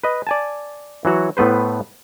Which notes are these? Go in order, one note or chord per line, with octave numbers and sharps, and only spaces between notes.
B4 D#5
D5 G#5 A5
E3 F#3 F#4 C#5
A2 A3 B3 B4 C5